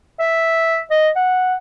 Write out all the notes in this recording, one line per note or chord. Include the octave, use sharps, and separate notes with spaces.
E5
D#5
F#5